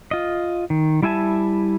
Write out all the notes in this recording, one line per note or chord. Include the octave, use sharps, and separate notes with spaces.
F4 D#5
D#3
G3 E4 E5 G#5 A5